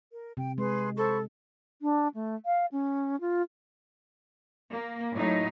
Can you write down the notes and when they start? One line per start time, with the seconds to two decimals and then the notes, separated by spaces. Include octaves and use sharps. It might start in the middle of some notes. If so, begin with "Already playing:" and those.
0.11 A#4
0.37 C3 G5
0.58 G#3 G#4 B4 C6
0.97 A4 C5 B5 C#6
1.82 D4
2.14 A3
2.46 F5
2.72 C#4
3.21 F4
4.71 A#3
5.13 A2 F#3 D#4